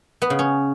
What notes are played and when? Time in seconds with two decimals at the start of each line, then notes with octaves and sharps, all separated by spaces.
0.22 B3
0.30 C#3
0.39 C#4